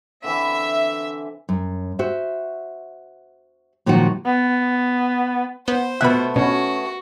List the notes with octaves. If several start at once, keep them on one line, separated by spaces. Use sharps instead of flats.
D3 E3 C4 E5
F#2
F#4 C5 E5
A#2 D#3 F3 F#3 D#4 F#4
B3
B3 C5 G6
B2 A3 B3 E5 B5 F#6
B2 C#4 F#4